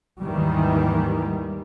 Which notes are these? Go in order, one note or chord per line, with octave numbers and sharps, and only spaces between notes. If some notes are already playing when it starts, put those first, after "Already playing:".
D#2 G#2 D#3 E3 G3